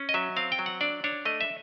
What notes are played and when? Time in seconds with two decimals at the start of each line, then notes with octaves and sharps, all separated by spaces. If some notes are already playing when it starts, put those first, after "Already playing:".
Already playing: C#4
0.09 D#5
0.14 F#3 E5
0.36 C4 F5
0.52 G5
0.59 F#3
0.66 F#5
0.81 D4 D5
1.04 D4 C#5
1.25 A3 D#5
1.41 E5